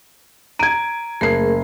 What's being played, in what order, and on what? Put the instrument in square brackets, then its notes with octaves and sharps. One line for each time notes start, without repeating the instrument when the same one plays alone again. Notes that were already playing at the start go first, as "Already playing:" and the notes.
[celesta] A#5 D7 [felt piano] G#6 D#7
[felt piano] F#1 C7 [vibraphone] A3 G#4 A#4